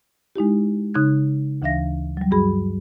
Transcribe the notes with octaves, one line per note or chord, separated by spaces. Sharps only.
G#3 D#4 E4 G4
C#3 D#4 C6 F#6 G#6
D2 E3 D4 E5 F5 A#6
F#3 G3
G2 G3 F#4 G#4 B5